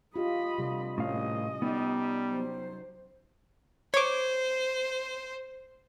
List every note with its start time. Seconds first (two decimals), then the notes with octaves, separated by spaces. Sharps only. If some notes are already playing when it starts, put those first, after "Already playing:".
0.16 F4 G4 D#5 B5
0.58 D2 C3 G3
0.98 A#1 A2 C#4 D#5 F5
1.62 G3 B3 D#4
2.31 F#3 C5
3.94 C5 C#5 D6